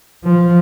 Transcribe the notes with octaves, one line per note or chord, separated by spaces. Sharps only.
F3